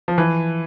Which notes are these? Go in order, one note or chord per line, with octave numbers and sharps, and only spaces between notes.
F3
E3